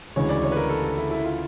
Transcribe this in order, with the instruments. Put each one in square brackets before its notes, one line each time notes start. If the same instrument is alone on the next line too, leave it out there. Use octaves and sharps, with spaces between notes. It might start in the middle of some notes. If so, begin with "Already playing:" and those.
[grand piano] D2 C#3 E3 G#3 [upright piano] C#5
[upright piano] D5
C#5
B4
A#4
A4
A4
E4
E4
F4